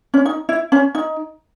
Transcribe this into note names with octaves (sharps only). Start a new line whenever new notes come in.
C#4
D#4
E4
C#4
D#4